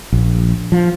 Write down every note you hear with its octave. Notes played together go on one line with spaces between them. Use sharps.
A#1
F3